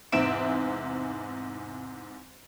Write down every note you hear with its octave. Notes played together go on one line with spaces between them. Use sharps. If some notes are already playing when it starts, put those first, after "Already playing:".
E2 G#2 C3 E5 D7 E7